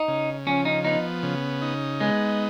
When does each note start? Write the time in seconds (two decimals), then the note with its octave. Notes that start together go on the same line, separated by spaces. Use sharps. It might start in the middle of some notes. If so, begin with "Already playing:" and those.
Already playing: D#4
0.08 C#3
0.47 F3 C#4
0.65 D#4
0.85 B3 D#4
1.23 C#3
1.62 D#4
2.01 G#3 B3